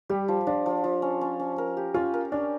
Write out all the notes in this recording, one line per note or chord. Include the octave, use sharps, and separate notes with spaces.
G3 G4
F3
F3 D4
F3
F3
C#4
C#4
C#4
A#4
G4
C#4 F4
A#4
C#4 D4